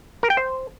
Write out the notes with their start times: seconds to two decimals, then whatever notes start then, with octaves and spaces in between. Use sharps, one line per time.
0.23 A#4
0.30 G5
0.37 C5